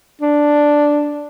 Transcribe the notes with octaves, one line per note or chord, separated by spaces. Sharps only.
D4